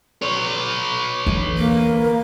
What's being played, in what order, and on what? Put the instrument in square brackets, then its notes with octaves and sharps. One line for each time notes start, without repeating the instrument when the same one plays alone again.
[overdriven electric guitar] B4 C#5
[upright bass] E2 D3
[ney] A#3